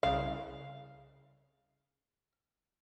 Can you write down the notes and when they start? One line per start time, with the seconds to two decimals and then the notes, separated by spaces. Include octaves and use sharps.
0.03 C2 C#3 F5